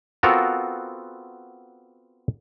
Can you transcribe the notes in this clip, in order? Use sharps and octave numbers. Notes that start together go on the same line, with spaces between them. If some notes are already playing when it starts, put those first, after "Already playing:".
B3 C4 F4 F#4 A4 A#4